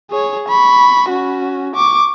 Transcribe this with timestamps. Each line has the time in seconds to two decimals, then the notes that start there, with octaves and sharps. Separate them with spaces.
0.11 G#4 C#5
0.48 B5 C#6
1.09 C#4 F#4
1.75 C#6 D6